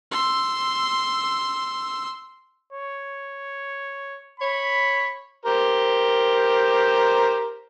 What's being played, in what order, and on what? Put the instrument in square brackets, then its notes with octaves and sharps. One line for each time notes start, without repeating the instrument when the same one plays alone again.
[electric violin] C6 E6
[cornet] C#5
[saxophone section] C#5 [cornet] B5
[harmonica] G4 A#4 C5